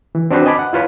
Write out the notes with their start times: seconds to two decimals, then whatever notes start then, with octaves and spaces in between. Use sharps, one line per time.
0.15 E3
0.31 C4 D4 F#4 B4 C5
0.46 D#5 G#5 A5 B5 D6
0.59 F#5
0.73 E4 F4 B4 C#5